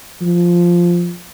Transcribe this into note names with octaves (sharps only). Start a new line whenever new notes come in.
F3